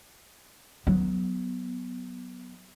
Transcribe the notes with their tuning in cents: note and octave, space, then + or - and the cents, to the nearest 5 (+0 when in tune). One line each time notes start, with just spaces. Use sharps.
F#3 +0 B3 +0